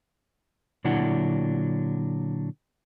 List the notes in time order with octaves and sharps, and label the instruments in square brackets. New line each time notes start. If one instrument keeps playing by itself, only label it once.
[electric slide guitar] A#2 D3 F#3 D4 E4 F#5